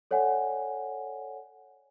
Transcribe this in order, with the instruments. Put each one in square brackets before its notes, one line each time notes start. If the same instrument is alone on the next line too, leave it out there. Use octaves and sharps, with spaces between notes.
[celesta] A4 C#5 D5 F#5 G#5